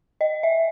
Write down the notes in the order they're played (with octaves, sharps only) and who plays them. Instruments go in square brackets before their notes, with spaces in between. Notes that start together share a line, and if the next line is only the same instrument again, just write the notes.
[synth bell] D#5
E5